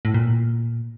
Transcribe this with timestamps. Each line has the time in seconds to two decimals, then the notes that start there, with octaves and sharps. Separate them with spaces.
0.05 A2
0.14 A#2